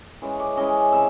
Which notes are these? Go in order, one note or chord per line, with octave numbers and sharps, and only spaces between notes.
E3 G#3 C#4
D5
E3 G#3 C#4 D#5
C3 E3 E5